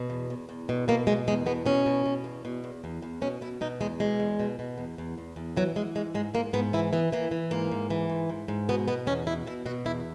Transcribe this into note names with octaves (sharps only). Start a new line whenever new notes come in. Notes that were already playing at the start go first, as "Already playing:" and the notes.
Already playing: B2
E2
E2
E2
B2
B2 A#3
B2 G#3
E2 G#3
B2 B3
B2 C#4
B2
B2
E2
B2
E2
E2
E2
B2 C#4
B2 E4
B2 D#4
E2 G#3
B2 G#3
E2
B2
B2
E2
E2
E2
E2
E3 F#3
E3 G#3
G#2 G#3
G#2 G#3
G#2 A#3
G#2 B3
E3 E4
E3 B3
E3 A#3
E3
G#2 A#3
G#2
E3
G#2
G#2
G#2
B2 B3
B2 B3
E2 C#4
B2 E4
B2 E4
B2 F#4
E2 E4